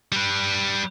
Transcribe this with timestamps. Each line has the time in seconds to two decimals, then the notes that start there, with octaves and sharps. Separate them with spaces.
0.12 G3 B4